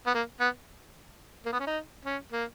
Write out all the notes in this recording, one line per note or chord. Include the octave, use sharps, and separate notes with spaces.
B3
A#3
B3
A#3
B3
C#4
D#4
C#4
A#3